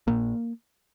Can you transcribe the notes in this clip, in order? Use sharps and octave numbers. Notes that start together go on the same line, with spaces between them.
A#1 A#2 A#3